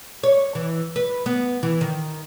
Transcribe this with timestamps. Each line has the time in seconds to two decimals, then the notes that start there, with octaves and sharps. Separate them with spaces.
0.23 C#5
0.55 E3
0.96 B4
1.26 B3
1.63 E3
1.81 D#3